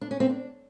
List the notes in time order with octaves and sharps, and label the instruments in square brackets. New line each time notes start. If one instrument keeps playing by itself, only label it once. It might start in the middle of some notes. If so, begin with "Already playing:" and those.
[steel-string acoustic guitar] D4
C#4
C4
D4